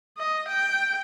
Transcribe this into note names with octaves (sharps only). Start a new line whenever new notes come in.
D#5
G5